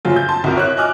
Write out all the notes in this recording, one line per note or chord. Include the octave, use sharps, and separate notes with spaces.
F#1 F#3 F4
G6
A5 C6
C2 F#4 A#4
C#5 F#6
D#5 G#5 D6 F6 F#6